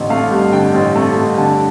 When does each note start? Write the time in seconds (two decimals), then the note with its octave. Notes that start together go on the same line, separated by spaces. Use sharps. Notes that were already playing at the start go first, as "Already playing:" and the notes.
Already playing: A1 D3
0.10 A3 F5
0.31 G2
0.53 D3 G5
0.74 A1
0.95 A3
1.18 G2
1.38 D3 A5